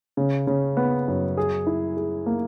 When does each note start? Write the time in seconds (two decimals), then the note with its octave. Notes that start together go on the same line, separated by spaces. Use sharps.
0.17 C#3
0.47 C#3
0.77 B3
1.08 F#2
1.37 G#4
1.67 E4
1.97 G#4
2.26 A#3